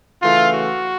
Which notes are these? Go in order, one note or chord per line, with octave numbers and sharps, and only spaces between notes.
C#3 E3 A3 F4
F#4